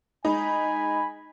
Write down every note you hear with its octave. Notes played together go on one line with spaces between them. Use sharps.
G#3 D#4 G#5 B5